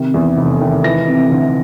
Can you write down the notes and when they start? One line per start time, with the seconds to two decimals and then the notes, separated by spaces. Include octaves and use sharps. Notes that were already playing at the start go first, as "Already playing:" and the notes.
Already playing: C3 D#3
0.14 E2
0.37 F1
0.61 D#3
0.84 E3 A#6
1.07 C3
1.32 D2